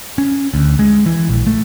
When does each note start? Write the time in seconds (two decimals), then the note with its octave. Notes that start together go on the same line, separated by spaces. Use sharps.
0.18 C#4
0.54 D2
0.79 G#3
1.06 E3
1.29 A#1
1.47 A3